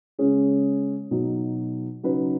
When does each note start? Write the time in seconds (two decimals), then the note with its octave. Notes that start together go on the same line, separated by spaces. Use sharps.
0.19 C#3 G#3 C#4 G#4
1.11 B2 F#3 D#4
2.03 C#3 F#3 D#4 B4